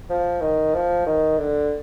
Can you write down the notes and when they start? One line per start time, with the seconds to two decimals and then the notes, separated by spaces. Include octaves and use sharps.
0.10 F3
0.41 D#3
0.74 F3
1.06 D#3
1.38 D3